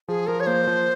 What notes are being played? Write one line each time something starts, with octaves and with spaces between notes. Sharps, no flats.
F3 G#4
F3 A#4
C#5
A#3 C5
F3